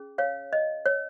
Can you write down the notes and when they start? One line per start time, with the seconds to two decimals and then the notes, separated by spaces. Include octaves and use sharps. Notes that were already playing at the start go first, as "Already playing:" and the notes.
Already playing: C#4 G#4
0.18 C#5 F5
0.53 D#5
0.86 C#5